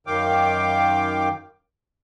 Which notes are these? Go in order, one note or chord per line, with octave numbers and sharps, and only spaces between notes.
F#2 D#3 F5 G5 D6